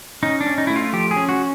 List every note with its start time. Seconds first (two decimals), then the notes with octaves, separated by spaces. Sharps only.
0.23 C#4 D#4
0.41 D4
0.46 C#4
0.58 D#4
0.67 A3 E4
0.76 F4
0.93 F3 G4
1.11 G#4
1.16 C#4
1.29 F#4